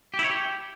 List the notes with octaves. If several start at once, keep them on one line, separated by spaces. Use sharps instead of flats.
G4
E4
C#5
G4